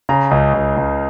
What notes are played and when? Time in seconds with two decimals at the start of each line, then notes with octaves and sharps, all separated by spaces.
0.09 C#3 A#5
0.31 C#2
0.54 C#2
0.77 C#2